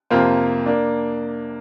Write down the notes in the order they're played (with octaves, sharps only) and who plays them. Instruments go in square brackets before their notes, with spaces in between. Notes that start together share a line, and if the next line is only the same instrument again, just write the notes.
[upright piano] F2 C3 A#3 F4 C5
A#3 D4